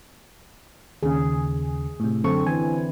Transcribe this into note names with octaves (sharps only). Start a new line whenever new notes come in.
D#2 C#3 G#4
A2 C3
F#2 D3 C4 A4 C#6
E3 G#5